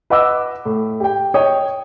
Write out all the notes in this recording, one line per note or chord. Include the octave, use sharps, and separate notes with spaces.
B4 D#5 F#5 D6 E6
A2
G4 G5
C#5 D#5 G5 D#6